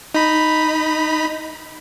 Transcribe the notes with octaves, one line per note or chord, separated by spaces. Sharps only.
D#4 B5